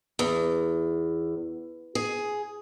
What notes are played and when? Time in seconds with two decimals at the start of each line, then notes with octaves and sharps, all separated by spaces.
0.19 E2
1.95 G#4